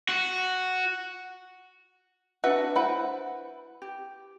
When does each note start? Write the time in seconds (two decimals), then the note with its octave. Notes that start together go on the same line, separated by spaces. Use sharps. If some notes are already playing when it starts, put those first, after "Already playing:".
0.09 F#4
2.44 D4 F#4 B4 E5 F#5
2.76 E4 B4 C5 F#5
3.82 G4